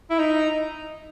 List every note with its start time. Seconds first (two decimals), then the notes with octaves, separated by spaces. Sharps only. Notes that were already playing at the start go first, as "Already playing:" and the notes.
0.10 E4
0.19 D#4